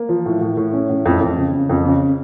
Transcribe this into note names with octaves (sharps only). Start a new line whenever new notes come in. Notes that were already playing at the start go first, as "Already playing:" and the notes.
Already playing: A#3
F3
A2
A2
A2
C#4
A2
F2
F2
C#3
C#3
F2
C#3